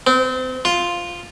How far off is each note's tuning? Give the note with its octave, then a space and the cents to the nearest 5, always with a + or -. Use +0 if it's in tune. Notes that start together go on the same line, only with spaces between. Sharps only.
C4 -30
F4 +0